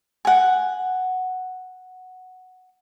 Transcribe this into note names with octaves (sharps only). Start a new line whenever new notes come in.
F#5 G#5